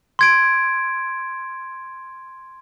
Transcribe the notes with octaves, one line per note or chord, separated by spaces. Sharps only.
C6 G#6 D7